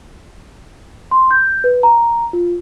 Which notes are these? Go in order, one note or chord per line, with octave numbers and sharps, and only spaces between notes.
C6
G6
B4
A#5
F4